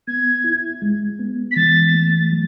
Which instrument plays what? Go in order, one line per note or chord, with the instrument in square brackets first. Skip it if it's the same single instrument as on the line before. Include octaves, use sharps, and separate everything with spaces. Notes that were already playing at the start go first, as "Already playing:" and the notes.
[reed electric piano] B3 [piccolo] G#6
[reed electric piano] E4
G#3
B3
[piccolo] B6
[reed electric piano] E3 [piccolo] A6
[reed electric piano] A3
F#3